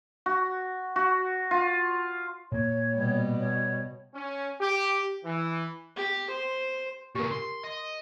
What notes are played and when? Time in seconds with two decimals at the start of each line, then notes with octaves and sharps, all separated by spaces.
0.26 F#4
0.96 F#4
1.51 F4
2.52 A#2 A#3 C#5
2.95 B2 G3
3.40 C#5
4.14 C#4
4.61 G4
5.24 E3
5.96 G4
6.30 C5
7.15 A#2 C#3 G4 A#4
7.31 C6
7.64 D#5